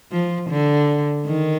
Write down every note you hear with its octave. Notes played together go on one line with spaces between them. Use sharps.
F3
D3
D#3